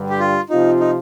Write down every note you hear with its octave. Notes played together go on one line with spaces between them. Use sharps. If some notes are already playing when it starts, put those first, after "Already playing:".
Already playing: G2 D3 G3
G4
F4
C3 F3 C4 D#4 F4
D#4